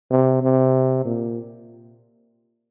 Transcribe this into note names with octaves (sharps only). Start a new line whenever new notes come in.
C3
C3
A#2